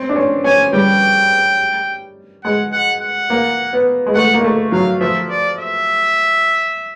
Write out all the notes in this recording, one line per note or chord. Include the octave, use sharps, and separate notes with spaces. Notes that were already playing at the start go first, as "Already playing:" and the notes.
Already playing: C4
D4
C#4
C#4 G#5
G3 G5
G#3 F#5
F#5
F#5
A#3
B3
G#3
A3 F#5
A#3
A3
F#3 F5
F3 E5
D5
E5